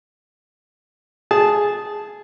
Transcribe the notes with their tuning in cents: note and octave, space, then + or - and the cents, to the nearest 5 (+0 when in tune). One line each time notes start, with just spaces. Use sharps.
G#4 +0 A5 -15